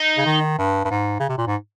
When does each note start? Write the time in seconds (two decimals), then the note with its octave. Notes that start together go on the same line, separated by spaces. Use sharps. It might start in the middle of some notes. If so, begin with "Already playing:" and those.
Already playing: D#4
0.17 C#3
0.25 D#3
0.58 G2
0.85 G2
0.90 G#2
1.19 C#3
1.29 C3
1.38 A#2
1.47 G#2